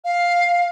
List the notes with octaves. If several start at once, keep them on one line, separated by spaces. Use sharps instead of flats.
F5